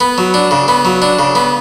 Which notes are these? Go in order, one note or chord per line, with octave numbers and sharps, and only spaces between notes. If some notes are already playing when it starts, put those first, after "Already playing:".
B3
F#3
D4
C#3
B3
F#3
D4
C#3
B3